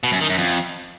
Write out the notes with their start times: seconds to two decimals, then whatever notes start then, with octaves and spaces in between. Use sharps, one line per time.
0.03 B2
0.12 F#2
0.21 D#3
0.29 F#2
0.38 F2